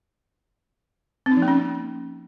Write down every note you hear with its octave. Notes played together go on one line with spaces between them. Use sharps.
C4
D#4
F3
A#3
C#4